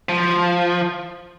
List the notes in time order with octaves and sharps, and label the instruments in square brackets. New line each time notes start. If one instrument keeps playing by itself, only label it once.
[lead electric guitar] F3